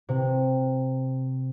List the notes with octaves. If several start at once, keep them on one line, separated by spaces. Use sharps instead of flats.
C3